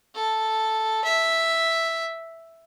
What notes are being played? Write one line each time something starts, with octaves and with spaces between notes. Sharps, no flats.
A4
E5